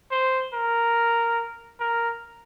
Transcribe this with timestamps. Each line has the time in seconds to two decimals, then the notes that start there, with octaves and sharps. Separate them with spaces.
0.11 C5
0.54 A#4
1.80 A#4